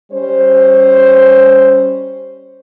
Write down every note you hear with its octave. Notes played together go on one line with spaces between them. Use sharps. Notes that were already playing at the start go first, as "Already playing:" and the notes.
G3 C#4 C5